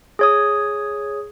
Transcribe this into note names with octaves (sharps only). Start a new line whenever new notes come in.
G#4 C#5 D#6